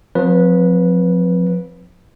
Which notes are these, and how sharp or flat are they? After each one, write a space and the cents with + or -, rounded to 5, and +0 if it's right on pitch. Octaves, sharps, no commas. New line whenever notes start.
F3 +35 C4 -5 B4 -15